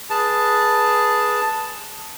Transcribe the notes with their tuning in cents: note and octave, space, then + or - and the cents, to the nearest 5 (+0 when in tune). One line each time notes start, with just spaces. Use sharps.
G#4 +0 B4 -20 A5 +0